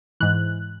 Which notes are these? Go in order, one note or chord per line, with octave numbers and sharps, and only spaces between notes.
G#2 E3 F#6